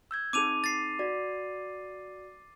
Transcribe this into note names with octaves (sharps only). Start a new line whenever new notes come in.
E6 G6 G#6
C4 D#4 G#4 D6 D#7 F7
A6 C7
F#4 D5